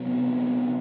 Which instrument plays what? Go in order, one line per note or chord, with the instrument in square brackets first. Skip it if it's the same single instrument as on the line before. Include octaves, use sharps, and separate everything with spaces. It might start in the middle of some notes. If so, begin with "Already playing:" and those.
Already playing: [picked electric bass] C3 F#3 B3